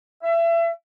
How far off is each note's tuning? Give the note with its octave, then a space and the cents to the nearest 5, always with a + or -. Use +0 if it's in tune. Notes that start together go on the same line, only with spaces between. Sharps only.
E5 +30